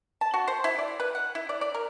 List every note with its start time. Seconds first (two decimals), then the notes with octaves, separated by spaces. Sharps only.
0.21 A5
0.34 F#4
0.48 C5
0.64 E4
0.78 D5
1.00 B4
1.15 F#5
1.35 E4
1.49 D5
1.61 D5
1.75 A#4